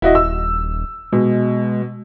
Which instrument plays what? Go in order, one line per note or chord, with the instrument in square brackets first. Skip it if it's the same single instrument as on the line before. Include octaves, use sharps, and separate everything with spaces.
[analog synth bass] D#1 [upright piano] E4 F#4 D#5
[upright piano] E6
[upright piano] B2 [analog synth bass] G#3